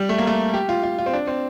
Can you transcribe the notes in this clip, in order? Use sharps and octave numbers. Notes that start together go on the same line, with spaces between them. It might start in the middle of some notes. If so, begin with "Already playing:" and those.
Already playing: G3
A3
A#3
A3
G4
F4
F4
F4
C4
D4
C4